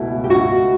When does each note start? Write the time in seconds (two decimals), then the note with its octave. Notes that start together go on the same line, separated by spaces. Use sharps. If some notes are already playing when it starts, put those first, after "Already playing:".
Already playing: C#2 B2 A3 E4
0.24 G4
0.30 F#4